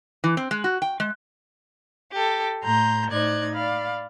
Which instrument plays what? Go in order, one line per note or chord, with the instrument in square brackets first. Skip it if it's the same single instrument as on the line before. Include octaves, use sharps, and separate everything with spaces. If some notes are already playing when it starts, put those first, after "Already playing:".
[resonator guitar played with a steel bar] E3
C4
G#3
F#4
G5
G#3
[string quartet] G4 A4
A2 A#5 C6 G6
A2 D#4 C5 D5 F#6 G#6
D5 F5 B5